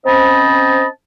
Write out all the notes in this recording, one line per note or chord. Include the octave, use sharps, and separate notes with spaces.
C4 C#4 C5 D#5 A5 B5